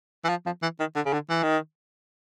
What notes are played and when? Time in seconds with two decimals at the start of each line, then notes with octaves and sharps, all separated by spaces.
0.24 E3
0.29 F3
0.46 F3
0.62 E3
0.80 D#3
0.96 D3
1.06 C#3
1.13 D3
1.30 E3
1.43 D#3